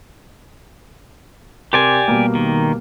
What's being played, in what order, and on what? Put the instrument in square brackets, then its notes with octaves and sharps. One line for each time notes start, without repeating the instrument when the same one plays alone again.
[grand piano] C3 A#4 C6 [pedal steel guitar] G4 D5 G#5
[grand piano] B2 G3 A#3
[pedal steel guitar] D#3